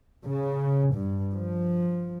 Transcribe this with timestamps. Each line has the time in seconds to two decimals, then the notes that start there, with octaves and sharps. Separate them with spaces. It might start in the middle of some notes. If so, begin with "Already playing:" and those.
0.25 C#3
0.93 G2
1.35 F3